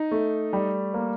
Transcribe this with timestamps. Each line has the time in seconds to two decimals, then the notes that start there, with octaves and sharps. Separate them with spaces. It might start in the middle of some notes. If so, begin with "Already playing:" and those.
Already playing: D#4
0.11 A3
0.53 G3
0.94 A#3